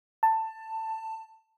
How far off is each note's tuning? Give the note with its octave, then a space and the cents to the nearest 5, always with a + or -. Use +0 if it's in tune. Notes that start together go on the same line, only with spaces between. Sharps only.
A5 +15